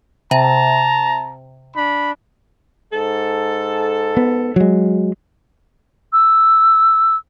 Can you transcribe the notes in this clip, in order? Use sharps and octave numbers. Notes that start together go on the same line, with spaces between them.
C3 A5 A#5
D4 B5
G#2 A4
B3
F#3 G#3
E6